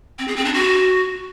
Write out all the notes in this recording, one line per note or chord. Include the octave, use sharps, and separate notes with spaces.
C4
G#4
C4
D4
F#4